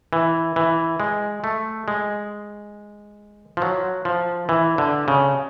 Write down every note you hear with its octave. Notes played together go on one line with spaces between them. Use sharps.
E3
E3
G#3
A3
G#3
F3
F#3
F3
E3
D3
C#3